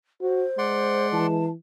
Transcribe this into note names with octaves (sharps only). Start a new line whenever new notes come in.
F#4 C5
G#3 D5 F#5 C6
E3 A5